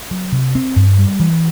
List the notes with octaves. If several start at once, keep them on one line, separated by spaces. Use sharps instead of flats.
F#3
C3
C4
G2
G3
E3